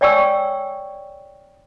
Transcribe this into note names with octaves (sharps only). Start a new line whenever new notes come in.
C#5 D5 G5 G#5 C#6 E6